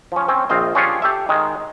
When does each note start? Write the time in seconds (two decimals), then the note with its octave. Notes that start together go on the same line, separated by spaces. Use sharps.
0.12 F3 C#4
0.28 C4 C#4 G5
0.50 A#1 C4 F4 C5 D#5
0.75 C#4 D4 F4 G4 G#4 C#5
1.02 G4 A4 E5
1.29 D#3 G#3